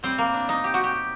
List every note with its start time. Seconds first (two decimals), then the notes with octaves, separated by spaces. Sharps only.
0.03 A2 G3 C4
0.18 A#3
0.34 D4
0.49 D#4
0.64 G4
0.74 F#4
0.84 G4